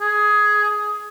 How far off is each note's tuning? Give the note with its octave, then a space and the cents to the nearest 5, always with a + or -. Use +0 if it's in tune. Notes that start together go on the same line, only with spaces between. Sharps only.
G#4 +10